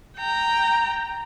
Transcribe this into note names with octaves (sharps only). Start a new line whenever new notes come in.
G5 A#5